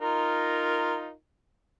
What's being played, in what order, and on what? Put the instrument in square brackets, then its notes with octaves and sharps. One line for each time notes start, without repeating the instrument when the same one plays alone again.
[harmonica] D#4 F4 A#4